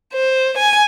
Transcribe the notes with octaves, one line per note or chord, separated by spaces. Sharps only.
C5
G#5